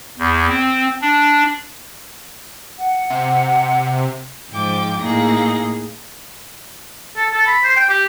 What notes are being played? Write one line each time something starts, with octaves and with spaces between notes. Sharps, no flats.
E2
C4
D4
F#5
C3
G#2 F3 G5 D6
A2 A#3 D#4 G#4 A#6
A4
A4
B5
C5
G5
G4